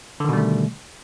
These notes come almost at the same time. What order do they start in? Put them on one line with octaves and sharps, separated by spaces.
D3 D#3 B2 G3 A3